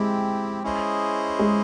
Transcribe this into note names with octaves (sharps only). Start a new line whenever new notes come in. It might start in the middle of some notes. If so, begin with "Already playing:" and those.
Already playing: G#3 C4 E4 G4
C#4 E4 G#4 C5 D#5
G#3